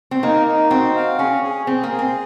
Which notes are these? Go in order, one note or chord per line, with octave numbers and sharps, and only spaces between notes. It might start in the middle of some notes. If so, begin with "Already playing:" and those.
C4
A#3 D#4
D#4
C4 F#4
F5
C#4 G#4
G#4
C4 G#4
A#3
G#4
C4